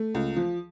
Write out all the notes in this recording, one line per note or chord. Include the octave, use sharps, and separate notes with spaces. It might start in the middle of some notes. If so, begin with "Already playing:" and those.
Already playing: A3
C#2
F3